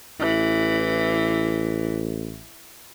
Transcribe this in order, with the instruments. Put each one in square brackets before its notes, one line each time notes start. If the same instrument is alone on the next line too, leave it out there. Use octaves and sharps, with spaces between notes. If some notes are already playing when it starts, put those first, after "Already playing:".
[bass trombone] A1 [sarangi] E3